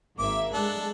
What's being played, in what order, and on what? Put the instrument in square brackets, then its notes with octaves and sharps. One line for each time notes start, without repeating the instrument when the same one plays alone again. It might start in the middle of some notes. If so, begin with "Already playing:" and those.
[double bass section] G#1 [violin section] A#3 E5 [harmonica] D6
[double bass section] G#3 [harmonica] D4 A4 [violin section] F#6